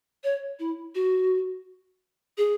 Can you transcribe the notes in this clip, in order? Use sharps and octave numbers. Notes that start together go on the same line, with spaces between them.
C#5
E4
F#4
G#4